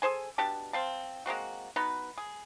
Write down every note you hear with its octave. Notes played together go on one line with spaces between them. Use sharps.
G#4 A4 C5 G#5
B2 D4 G4 A5
C4 F5 A5
G#3 A#3 C4 F#4
B3 D#4 F#4 B4
G#4